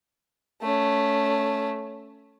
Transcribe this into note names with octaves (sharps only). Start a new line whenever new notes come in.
A3 C#4